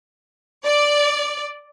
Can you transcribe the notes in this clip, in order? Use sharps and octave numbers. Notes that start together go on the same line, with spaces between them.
D5